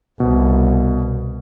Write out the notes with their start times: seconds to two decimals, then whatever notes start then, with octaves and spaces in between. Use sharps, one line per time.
0.20 C2 B2